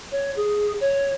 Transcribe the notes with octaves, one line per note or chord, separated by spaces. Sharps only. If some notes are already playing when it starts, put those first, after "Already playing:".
C#5
G#4
C#5